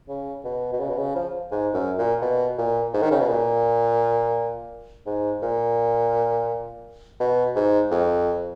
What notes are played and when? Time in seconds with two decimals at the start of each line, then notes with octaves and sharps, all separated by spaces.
0.09 C#3
0.45 B2
0.73 B2
0.79 C#3
0.89 B2
0.98 C#3
1.15 F3
1.51 G#2
1.74 F#2
1.98 A#2
2.22 B2
2.58 A#2
2.94 G#2
3.02 D#3
3.11 C#3
3.20 B2
3.29 A#2
5.06 G#2
5.42 A#2
7.20 B2
7.56 G#2
7.91 F2